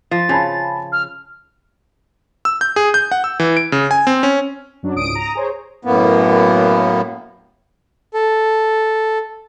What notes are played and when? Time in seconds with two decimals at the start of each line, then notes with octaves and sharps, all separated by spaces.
0.11 F3 A6
0.29 C#3 G#5 A5 B5
0.92 F6
2.45 E6
2.61 G6
2.76 G#4
2.94 G6
3.12 F#5
3.24 E6
3.40 E3
3.57 D7
3.72 C#3
3.91 G#5
4.07 C4
4.23 C#4
4.83 F#2 F#3 D4
4.96 C#2 G#2 D#6 D7
5.15 A#5 D#6
5.35 G#4 C5 C#5
5.85 F#2 A2 A#3 B3
8.14 A4